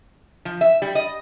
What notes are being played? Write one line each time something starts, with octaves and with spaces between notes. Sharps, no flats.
F3
E5
G3
D#5